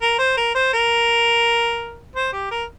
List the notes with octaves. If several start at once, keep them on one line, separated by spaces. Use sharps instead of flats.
A#4
C5
A#4
C5
A#4
C5
G4
A#4